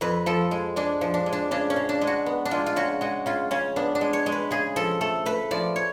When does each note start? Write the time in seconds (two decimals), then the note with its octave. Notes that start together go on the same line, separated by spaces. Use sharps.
0.01 F2 B4
0.26 F3 A4
0.51 G#3
0.76 G#3 D4
1.01 F3
1.14 D4
1.26 G#3
1.33 D4
1.51 C#3 D4
1.70 C#4
1.76 C#3
1.89 D4
2.01 G#3
2.07 F#4
2.26 B3
2.45 D4
2.51 G#3 F4
2.66 F4
2.76 C#3 F#4
3.01 G#3 F#4
3.26 C#3 F4
3.51 C#3 C#4
3.76 B3 D4
3.95 D4
4.01 G#3
4.13 C#5
4.26 G#3
4.32 B4
4.51 C#3 G#4
4.76 F3 A4
5.01 A3 A4
5.26 A3 B4
5.51 F3 D5
5.76 C#5